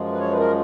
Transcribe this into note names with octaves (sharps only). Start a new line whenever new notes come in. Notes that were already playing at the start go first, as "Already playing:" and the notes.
Already playing: F#2 F3 G#3
B4
C#5
B4
A#4